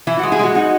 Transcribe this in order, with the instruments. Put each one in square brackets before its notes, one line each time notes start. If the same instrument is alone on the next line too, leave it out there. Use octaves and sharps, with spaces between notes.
[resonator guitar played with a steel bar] E3 E4
G#3 F#4
E4 G#4
G#3 F#4
D#4 F#4